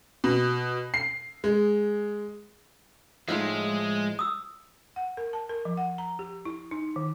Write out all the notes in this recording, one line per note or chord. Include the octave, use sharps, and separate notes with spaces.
B2
C7
G#3
A2 F3 G#3 D#4 F4 E5
D#6 E6
F#5
A#4
A5
A#4
F3
F#5
A#5
G4
E4
D#4
D#3